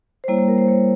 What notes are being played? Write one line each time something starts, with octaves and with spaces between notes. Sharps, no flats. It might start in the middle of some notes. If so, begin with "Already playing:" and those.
C5
G3 A#3 E4 C#5
C#5
A#4
C5
C#5